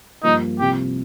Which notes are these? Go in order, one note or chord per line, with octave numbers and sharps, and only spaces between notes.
G2 F3 A#3 D#4
C2 C3 F3 G4